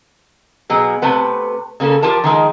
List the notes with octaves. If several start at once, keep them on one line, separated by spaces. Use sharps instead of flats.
B2 F#3 G#4
C3 A3 B4 F#5
C#3 A#3 C#4 A4
F3 F4 G4 A#4 A5
D#3 F3 G#3 A#4